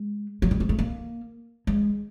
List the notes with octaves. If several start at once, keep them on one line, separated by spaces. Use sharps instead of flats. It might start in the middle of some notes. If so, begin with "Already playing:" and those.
Already playing: G#3
F#3
G3
G#3
A3
A#3
G#3